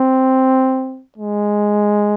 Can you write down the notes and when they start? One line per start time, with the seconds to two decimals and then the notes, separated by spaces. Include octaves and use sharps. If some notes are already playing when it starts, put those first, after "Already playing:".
Already playing: C4
1.18 G#3